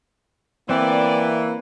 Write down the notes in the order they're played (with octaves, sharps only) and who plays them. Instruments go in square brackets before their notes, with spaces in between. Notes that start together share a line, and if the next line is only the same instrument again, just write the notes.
[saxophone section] E3 [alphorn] A#3 [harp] C4 [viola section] D5